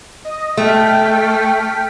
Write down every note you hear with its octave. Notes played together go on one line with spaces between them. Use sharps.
D#5
A3 G5 F6 B6